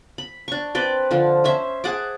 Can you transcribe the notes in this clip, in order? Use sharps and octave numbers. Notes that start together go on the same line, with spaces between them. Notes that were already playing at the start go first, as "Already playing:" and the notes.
B5
D4 C#6
C4 B4 D5 G5
D3 F3
C#4 C5 E5
G#4 F#5 A5 D6